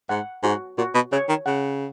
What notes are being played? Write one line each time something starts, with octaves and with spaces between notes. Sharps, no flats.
G#2 F#5
G#2 F#4
A#2 F#4
B2
C#3 C#5
D#3
C#3 F#5